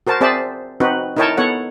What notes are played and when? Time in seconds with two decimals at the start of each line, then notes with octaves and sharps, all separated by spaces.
0.07 F#4 A#4 C5 A5
0.21 C4 G#4 C5 D5 E5 A5
0.80 C4 D#4 F#4 B4
1.16 D#4 E4 A#4 C#5 G5 A5
1.37 B3 A4 C#5 F#5